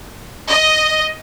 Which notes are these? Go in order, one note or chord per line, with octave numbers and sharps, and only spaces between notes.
D#5